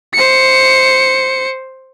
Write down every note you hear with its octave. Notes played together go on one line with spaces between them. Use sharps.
C5 C#7